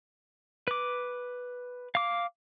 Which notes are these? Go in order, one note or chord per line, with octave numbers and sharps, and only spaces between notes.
B4 D6
F5 D6